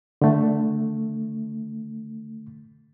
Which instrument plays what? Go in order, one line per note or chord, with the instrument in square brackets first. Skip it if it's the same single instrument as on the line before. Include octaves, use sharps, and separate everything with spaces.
[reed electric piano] D3 A3